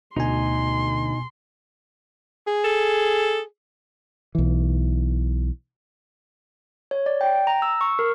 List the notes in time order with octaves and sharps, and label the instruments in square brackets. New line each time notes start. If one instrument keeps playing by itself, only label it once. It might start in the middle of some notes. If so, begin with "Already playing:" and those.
[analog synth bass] D2 [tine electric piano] B2 G#5 [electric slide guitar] D#4 [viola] C6
[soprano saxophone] G#4
[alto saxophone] A4
[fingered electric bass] B1 E3
[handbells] C#5
D5
G5
A#5
E6
C#6
A#4